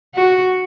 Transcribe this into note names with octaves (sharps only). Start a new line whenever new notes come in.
F#4